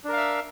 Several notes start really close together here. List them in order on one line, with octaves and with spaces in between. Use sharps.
D4 A#4 F5 E5